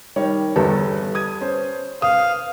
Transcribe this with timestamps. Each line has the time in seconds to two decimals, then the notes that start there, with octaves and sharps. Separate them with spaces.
0.16 D#3 G3 C#5
0.56 G1 E2 G3 A4 B4 A5
1.15 D#6 G#6 D#7
1.41 C#4 C5
2.02 F5 D#6